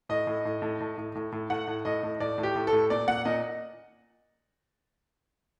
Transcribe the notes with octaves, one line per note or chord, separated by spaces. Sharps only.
A2 D#5
A2
A2
A2
A2
A2
A2
A2
A2 F#5
A2
A2 D#5
A2
A2 D5
A2
G4
A2
A4
A2
A#2 D5
A#2 F#5
A#2 D#5